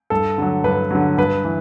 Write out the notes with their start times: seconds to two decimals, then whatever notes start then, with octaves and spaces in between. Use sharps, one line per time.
0.10 G2 A4
0.38 D3 F#3
0.64 G2 B4
0.91 D3 F#3
1.18 G2 B4
1.44 E3